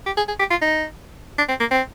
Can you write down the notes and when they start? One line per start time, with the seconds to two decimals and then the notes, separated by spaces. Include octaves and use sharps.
0.06 G4
0.17 G#4
0.28 G#4
0.40 G4
0.50 F4
0.61 D#4
1.38 D4
1.49 C4
1.60 A#3
1.71 C4